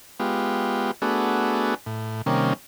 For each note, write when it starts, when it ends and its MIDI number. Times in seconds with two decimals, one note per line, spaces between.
0.20 0.91 56
0.20 0.91 59
0.20 0.91 65
0.20 0.91 67
1.02 1.75 57
1.02 1.75 59
1.02 1.75 62
1.02 1.75 66
1.02 1.75 68
1.86 2.22 45
2.26 2.53 48
2.26 2.53 51
2.26 2.53 55
2.26 2.53 58
2.26 2.53 61